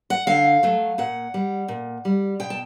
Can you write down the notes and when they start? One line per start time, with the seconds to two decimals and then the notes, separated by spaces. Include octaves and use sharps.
0.10 F#5
0.27 D3 F5
0.63 F#3 A3
0.98 A#2 F#5
1.34 G3
1.68 A#2
2.05 G3
2.40 B2 G5
2.50 A5